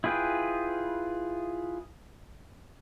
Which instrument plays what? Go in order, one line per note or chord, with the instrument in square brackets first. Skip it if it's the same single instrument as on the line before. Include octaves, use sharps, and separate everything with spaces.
[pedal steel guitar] E4 F4 G#4 B4 G5